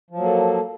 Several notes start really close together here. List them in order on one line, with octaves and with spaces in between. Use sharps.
F3 F#3 A#3 A4